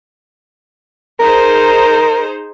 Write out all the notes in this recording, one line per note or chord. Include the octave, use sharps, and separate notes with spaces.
D#4 G#4 A#4 C5